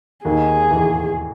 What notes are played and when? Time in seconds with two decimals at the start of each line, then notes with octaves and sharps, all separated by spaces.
0.25 D#2 D#3 G#4
0.71 E2 E3